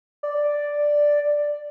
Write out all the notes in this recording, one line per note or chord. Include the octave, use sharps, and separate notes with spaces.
D5